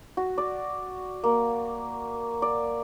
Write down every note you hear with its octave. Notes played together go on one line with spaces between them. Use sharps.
F#4
D5
A#3
D5